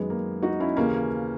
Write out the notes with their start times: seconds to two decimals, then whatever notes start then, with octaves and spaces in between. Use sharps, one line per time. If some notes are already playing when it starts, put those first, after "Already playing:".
Already playing: F#2 D#3 F#3 G#3 B3
0.10 A#3
0.43 D#4 F#4
0.60 C#4 E4
0.76 D#2 C#3 E3 A#3 C#4